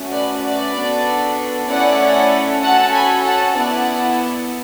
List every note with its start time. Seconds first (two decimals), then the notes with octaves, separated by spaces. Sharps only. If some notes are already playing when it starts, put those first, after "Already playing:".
Already playing: A3 C#4 F#4
0.11 B4 D5
0.43 B4 D5
0.74 B3 D4 F#4 A4
1.68 A3 C#4 E4 A4 D5 F#5
2.62 C#4 F#4 A4 F#5 A5
2.94 G#5 B5
3.25 F#5 A5
3.56 B3 E4 A4 D5 F#5